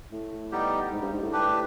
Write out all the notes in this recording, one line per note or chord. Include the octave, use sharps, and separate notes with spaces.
A2
G3 B3 D#4 G4
G#2
G2
G#2
A2
D4 G4 B4